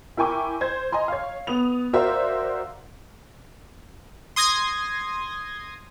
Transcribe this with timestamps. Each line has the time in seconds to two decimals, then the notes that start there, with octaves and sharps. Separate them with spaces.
0.17 E4 A#4 G5 G#5 C#6 D6
0.61 C5 G#6
0.92 D#5 G#5 A#5 C6
1.08 C#5 F5
1.47 B3 D#6 F7
1.93 F#4 A#4 C5 D5 E5 F5
4.36 C6 D#6 G#6 A#6 C7